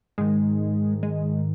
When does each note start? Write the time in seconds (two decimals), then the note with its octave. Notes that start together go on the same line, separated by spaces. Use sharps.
0.18 G#2 D#3 G#3
1.03 G#3